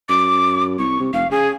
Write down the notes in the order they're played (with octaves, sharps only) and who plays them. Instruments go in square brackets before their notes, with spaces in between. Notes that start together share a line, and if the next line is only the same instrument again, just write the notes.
[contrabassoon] F#2 [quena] D6
[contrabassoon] C2 [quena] C#6
[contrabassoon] C3
[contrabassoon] F1 [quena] F5
[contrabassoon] C#3 [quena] G#4